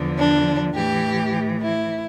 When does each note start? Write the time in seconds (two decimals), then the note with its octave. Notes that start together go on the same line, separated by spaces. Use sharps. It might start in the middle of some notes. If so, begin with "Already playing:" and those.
Already playing: E2 D3 F3
0.17 D4
0.74 A2 E3 G4
1.61 E4